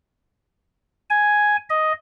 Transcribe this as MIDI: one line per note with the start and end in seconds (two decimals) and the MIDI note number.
1.10 1.57 80
1.70 1.92 75